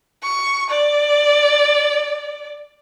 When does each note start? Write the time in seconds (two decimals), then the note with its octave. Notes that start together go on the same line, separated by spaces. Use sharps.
0.23 C#6
0.70 D5